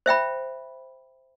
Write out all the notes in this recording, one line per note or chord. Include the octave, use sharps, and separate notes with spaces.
C5 E5 G5 B5